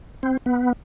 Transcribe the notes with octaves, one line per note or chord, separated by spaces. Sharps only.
C4
B3